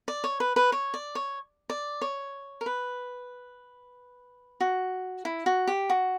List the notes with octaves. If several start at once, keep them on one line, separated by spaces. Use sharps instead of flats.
D5
C#5
B4
B4
C#5
D5
C#5
D5
C#5
A#4
B4
F#4
E4
F#4
G4
F#4